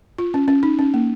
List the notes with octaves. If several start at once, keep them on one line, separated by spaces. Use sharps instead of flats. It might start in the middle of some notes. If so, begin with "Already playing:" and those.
F4
C#4
C#4
D#4
C#4
A#3